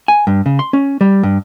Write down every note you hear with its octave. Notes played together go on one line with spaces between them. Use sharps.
G#5
G2
C#3
C6
C#4
G3
G2